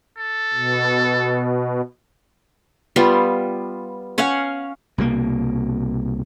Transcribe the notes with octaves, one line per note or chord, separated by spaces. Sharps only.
A4
B2
G3 B3 F4
C#4 C#5 F5 F#5
C2 B2 D3 A#3